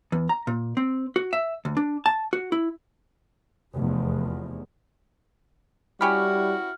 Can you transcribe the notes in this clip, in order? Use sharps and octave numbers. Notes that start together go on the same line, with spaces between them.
E2
A#5
A#2
C4
F#4
E5
D2
D4
A5
F#4
E4
F1 E2
G3 C#4 E4 F#4 G4 B5 F6